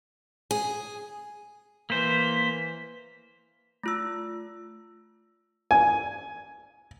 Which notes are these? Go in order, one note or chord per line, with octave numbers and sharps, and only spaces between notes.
G#4
E3 A#3 C5 B6
A3 F4 E6
G#5